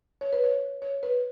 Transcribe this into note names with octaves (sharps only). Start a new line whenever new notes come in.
C#5
B4
C#5
C#5
B4